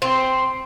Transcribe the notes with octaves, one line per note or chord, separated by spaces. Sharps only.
C4